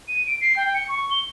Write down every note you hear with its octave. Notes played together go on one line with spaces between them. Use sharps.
D#7
D7
C7
G5
C#7
C#6
G7